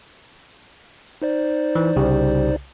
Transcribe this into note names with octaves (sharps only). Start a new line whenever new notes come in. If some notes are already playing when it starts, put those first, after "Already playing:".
D#4 C5 D5
E3
C2 C#3 G4